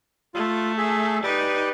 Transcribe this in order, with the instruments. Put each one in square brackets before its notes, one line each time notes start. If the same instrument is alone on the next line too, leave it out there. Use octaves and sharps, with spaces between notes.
[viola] A3 [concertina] F4
[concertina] G#4 E5
[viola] D#4 B4 [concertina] G4 D5